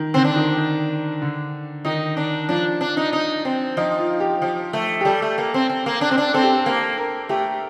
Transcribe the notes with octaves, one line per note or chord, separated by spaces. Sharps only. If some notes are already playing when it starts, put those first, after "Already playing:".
Already playing: D#3
D3 C4
D4
D#3
D#3
D3
D#3 D#4
D4
F3 D4
D4
D#4
D#4
C4
F3 D#4
F4
G4
F3
A3
G4
G3 A4
A3
A#3
C4
C4
A#3
D4
C4
D4
C4 A4
G4
A4
A#3
A#4
A3 G4